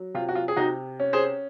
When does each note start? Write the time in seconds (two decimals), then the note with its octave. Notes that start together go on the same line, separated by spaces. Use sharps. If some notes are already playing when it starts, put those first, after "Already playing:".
Already playing: F#3
0.14 C3 F4
0.29 F#4
0.35 F4
0.48 G#4
0.56 C3 D#4 F#4
1.00 C#4
1.13 G#4 C5